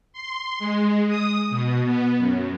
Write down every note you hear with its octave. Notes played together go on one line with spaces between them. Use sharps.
C6
G#3
D#6
B2
B3
F#2